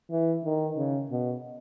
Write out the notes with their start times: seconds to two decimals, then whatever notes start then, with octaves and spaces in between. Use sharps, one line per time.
0.11 E3
0.44 D#3
0.77 C#3
1.11 B2